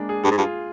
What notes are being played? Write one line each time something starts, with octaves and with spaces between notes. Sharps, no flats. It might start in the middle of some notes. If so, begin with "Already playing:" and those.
Already playing: G#3 A#3 D4
G#4
G2 G#4
G#2
G2 F4